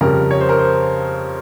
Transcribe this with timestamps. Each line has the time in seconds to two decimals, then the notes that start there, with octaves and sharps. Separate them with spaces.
0.01 F2 C#3 G3 A#4
0.31 C#5
0.40 C5
0.49 A#4
0.59 C5